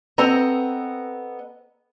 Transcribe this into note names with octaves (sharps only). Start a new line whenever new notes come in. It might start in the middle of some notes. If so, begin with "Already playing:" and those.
B3 C4 A4 D#5 A#5